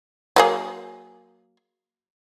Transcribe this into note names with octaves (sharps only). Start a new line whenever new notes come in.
F#3 A#3 G#4